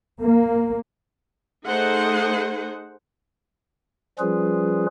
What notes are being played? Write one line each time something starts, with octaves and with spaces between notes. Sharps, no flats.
A#3
A3 D#4 G#4 C5 F#5
F3 G3 C#4 F4 G#4 B4